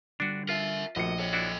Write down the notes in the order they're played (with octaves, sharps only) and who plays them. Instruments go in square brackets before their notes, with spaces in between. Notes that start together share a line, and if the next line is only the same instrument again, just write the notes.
[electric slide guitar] D3 G3 [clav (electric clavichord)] D4 F#4
[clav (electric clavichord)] F4 [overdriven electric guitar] A#4 E5
[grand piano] A#1 C#7 [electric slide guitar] A3 F#4 A#4 [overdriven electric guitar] D#5
[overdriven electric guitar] A4 D#5 [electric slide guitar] C#5
[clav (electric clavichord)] D4 E4 F#4